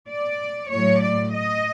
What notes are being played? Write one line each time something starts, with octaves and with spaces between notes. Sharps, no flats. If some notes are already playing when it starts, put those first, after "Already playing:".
D5
A2 F#3 A3 C#5
D5
D#5